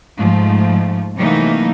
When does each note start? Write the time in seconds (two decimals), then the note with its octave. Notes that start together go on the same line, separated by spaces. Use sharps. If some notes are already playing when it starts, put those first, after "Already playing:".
0.17 G#2 F3 A3
1.16 C3 E3 F#3 A3 A#3 D#4